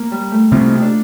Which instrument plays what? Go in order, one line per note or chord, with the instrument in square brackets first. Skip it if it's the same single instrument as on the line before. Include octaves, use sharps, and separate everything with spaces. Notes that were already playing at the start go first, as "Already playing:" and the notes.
Already playing: [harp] A#3
G3
A3
[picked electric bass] C3 G3 C4 [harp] F4
[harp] D#4
D4